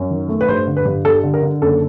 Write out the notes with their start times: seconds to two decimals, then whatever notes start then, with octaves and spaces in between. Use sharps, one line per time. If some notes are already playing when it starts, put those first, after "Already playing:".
Already playing: F#2
0.10 D#3
0.29 A3
0.41 B4
0.48 G2 C5
0.67 D3
0.77 B4
0.85 G2
1.05 G3 A4
1.23 D3
1.34 A#4
1.43 D3
1.62 F#1 A4